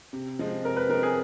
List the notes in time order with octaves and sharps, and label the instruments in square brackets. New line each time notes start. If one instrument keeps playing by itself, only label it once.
[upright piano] C3
F3 G#3 C4
[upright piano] C3 [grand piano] A#4
[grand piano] B4
[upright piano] F3 G#3 C4 [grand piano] A#4
[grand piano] G#4